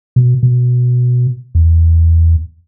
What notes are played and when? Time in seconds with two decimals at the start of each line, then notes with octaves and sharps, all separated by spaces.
0.16 B2
0.43 B2
1.55 E2